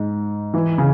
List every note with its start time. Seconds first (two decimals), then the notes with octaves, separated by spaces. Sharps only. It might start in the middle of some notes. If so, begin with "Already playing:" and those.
Already playing: G#2
0.54 E3
0.78 C#3